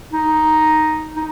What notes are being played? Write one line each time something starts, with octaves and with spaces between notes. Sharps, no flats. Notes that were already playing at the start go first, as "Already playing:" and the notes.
D#4
D#4